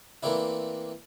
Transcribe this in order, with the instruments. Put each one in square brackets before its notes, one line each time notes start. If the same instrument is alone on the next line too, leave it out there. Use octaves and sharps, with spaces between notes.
[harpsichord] E3 A3 A#3 C4 D4 E4